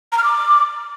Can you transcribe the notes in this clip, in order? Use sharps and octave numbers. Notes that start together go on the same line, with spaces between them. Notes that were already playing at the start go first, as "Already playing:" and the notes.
A#5
F6
D6